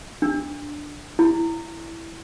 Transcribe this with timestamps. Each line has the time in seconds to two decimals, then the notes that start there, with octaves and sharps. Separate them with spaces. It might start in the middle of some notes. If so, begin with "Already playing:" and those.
0.22 D4
1.19 E4